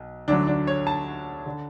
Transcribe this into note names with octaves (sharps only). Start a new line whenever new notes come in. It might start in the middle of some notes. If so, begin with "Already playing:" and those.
Already playing: B1
D2 D3 F#3 D4
D4
C#5
A5
D3